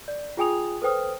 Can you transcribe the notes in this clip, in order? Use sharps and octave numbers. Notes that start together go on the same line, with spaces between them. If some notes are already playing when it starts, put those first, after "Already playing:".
D5
F4 G#4 G5 G#5 D#6 F7
A4 B4 C5 G5 D#6 F6